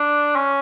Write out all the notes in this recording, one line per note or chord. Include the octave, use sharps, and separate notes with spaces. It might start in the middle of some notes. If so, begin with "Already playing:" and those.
Already playing: D4
C#4